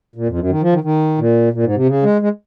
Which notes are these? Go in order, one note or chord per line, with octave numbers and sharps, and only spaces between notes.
A#2
F2
F#2
D#3
F3
D#3
D#3
A#2
A#2
G#2
C3
C#3
G#3
G#3